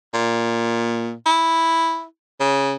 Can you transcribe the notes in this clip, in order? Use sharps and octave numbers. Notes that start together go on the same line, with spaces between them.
A#2
E4
C#3